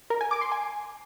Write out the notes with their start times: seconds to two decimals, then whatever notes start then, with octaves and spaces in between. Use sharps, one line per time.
0.10 A#4
0.21 G#5
0.31 D6
0.41 C6
0.52 G#5